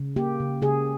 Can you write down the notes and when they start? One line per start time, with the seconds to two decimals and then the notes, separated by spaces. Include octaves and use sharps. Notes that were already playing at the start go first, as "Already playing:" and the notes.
Already playing: C#3
0.16 A#3 G4
0.40 C#3
0.62 C#3 G#4